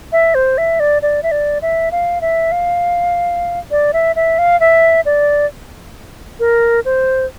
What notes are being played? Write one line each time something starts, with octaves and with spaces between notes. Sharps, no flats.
E5
C5
E5
D5
D5
E5
D5
E5
F5
E5
F5
D5
E5
E5
F5
E5
D5
A#4
C5